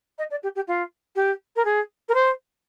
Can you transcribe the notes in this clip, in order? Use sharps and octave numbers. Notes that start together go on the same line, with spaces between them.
D#5
D5
G4
G4
F4
G4
A#4
G#4
A#4
C5